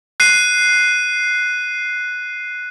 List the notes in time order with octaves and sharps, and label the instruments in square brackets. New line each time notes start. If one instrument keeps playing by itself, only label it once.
[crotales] F#6 C7 D#7